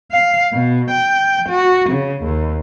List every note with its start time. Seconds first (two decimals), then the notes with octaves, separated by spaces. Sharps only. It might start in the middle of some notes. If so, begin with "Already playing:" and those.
0.11 F5
0.53 B2
0.90 G5
1.49 F#4
1.90 C#3
2.23 D#2